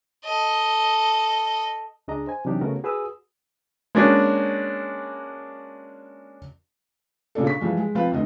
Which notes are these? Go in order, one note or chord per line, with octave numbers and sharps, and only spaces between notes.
A4 D#5
C#2 D4 G#4 D#5 A#5
C5 G#5
C3 E3 F#3 D4 D#4 G4
C#3 A3 B3 C#4 F#4 A#4
F#4 G#4 B4 G#5 D#6 E6
G#3 A#3 C#4 D4 F#4
A#2 C#3 C#4 D4 A4
C#6 B6
E3 F3 G3 G#3
G#3
F3 C4 F4 B4
F1 D2 D3 D#5